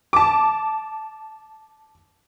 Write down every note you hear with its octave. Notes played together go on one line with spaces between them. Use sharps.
A5 D6